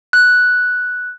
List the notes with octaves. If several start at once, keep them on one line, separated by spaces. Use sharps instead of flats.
F#6